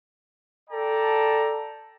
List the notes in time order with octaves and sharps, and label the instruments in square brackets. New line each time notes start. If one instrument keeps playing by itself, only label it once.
[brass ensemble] A4 D5 G5 A5 A#5